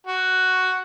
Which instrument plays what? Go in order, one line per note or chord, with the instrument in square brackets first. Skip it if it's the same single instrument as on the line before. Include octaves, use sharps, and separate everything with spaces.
[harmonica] F#4